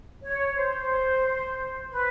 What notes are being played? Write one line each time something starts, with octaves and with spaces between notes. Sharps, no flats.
C#5
C5
B4